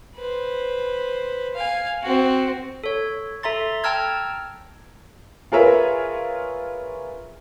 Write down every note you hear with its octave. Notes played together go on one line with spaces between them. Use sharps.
B4 C5
F5 G#5
C4 F#4
A4 C#5
A4 E5 A#5 C6 A6
G5 A5 A#5 E6 F6 G#6
F4 G#4 A#4 B4 C#5 E5